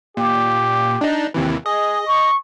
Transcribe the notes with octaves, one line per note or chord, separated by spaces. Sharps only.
A#2 G4
D4 D#4
D#2 C3 E3
G#4 D#5
C#6